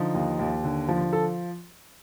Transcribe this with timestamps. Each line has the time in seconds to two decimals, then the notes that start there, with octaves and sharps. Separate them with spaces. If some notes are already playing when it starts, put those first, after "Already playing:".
Already playing: D3 F3 D#4
0.14 D#2
0.39 D#2
0.64 D3
0.88 F3
1.13 A4